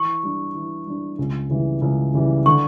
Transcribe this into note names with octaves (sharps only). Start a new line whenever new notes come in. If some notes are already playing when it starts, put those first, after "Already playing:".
Already playing: E3 C#6
G3 D4
E3
G3 D4
C#2
C#3 E3 G3
C#2
C#3 E3 G3
D3 C#6